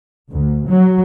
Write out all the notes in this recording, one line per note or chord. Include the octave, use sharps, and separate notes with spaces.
D2
F#3